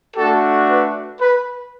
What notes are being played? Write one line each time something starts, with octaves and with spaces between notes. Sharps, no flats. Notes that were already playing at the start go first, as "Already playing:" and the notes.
A3 D4 F#4 A4
B4
B4